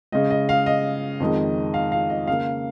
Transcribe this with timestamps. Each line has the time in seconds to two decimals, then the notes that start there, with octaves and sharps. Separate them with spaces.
0.12 C#3 G#3 D#5
0.30 D#5
0.49 F5
0.66 D#5
1.20 F2 D#3 G#3
1.74 F5
1.92 F5
2.10 D#5
2.27 C#3 A#3 F5